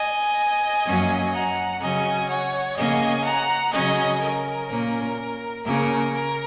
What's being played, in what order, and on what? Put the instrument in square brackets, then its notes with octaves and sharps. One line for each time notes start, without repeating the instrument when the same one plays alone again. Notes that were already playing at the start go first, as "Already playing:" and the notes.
Already playing: [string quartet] D#5 G#5
F#2 F#3 A#3 C#4
F#5 A#5
C#3 F#3 C#4 D#5 G#5
C#5 F#5
C#3 A#3 C#4 D#5 G#5
F#5 A#5
C#3 F#3 C#4 D#5 G#5
A#4
A#2 A#3 C#4
C#3 A#3 C#4 A#4
A#4